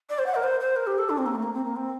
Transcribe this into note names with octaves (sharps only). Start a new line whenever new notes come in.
D5
C5
F#5
A#4
C5
C5
A#4
G4
A4
D4
C4
A#3
A3
A#3
C4
A#3
C4